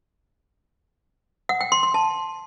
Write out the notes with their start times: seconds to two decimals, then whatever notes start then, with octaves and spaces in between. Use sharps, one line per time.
1.49 F#5
1.61 G5
1.72 C6
1.83 C6
1.94 A5